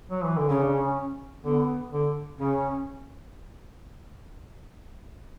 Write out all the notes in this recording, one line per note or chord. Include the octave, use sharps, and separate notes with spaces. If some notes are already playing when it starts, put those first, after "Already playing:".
F#3
E3
D3
C#3 C#4
D4
C#4
D3 B3
D3
C#3 C#4